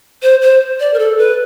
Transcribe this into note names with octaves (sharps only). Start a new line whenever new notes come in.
C5
C5
D5
A#4
A4
B4